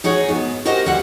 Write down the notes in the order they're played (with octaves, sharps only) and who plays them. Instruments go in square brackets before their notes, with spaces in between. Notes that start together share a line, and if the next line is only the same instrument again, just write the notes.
[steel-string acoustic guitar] D#4 F#4 G#4 C#5
G#2 B3
F#4 G4 A#4 C5 D#5 F#5
D2 G3 A#3 F#5